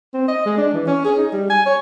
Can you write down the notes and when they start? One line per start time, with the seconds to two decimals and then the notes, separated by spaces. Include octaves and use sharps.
0.14 C4
0.28 D#5
0.45 G#3
0.57 D4
0.73 E3
0.87 C#4
1.05 G#4
1.18 D#4
1.32 G3
1.50 G#5
1.66 C#5